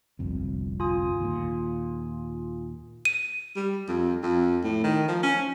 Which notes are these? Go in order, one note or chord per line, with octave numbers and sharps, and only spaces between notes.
G1 C2 F2
F4 G#5 D#6
D#2 A#2
D#7
G3
F2
F2
A2
D#3
F3
C#4